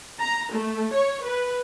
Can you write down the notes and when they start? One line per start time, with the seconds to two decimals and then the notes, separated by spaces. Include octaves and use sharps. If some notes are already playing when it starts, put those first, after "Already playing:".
0.20 A#5
0.52 A3
0.93 C#5
1.25 B4